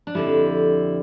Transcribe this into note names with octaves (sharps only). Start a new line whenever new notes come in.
D4
F2 D3 G3 E4